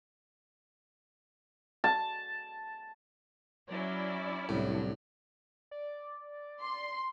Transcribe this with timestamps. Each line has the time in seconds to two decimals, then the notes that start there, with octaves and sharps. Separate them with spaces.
1.84 A5
3.70 F#3 C#4 E4 D5
4.49 C2 A2 F#3 D4
5.71 D5
6.62 C6